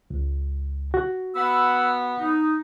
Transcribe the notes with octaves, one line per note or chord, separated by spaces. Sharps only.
C#2
F#4
B3 F#5 B5 E6
D#4